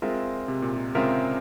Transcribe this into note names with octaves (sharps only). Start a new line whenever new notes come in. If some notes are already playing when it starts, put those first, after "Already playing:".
G#3 C4 F4 A#4 E5
C3
A#2
C3
C#3 G#3 C4 F4 A#4 E5